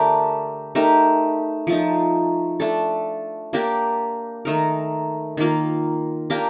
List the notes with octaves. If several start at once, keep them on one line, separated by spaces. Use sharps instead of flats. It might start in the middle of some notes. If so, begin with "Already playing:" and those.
Already playing: D3 A3 D4 G4 A#4
A3 D#4 G4 A#4
F3 A3 D#4
A3 D4 A4
A#3 D4 G4 A#4
D#3 A3 D#4 A#4
D#3 A#3 F4
A#3 D4 G4 A#4